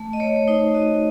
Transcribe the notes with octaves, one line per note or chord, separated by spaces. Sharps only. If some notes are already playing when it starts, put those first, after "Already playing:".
Already playing: A3
D#5
A3 C#5
C#5
D#4 C5
F#4 D#5